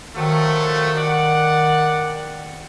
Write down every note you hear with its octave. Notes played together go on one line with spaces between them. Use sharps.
D#3 F3 F#3 A3
D5 F#5